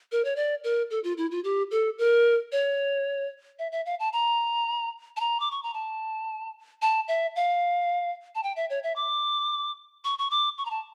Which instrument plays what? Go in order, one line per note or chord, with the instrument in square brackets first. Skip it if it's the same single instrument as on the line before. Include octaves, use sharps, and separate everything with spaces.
[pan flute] A#4
C#5
D5
A#4
A4
F4
E4
F4
G4
A4
A#4
C#5
E5
E5
F5
A5
A#5
A5
A#5
D6
C#6
A#5
A5
A5
E5
F5
A5
G5
E5
C#5
E5
D6
C#6
C#6
D6
C#6
A#5
A5